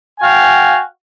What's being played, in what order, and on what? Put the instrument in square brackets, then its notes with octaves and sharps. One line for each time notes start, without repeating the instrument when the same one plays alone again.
[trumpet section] F#4 F5 G5 G#5